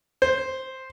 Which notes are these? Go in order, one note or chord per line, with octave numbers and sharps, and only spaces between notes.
C5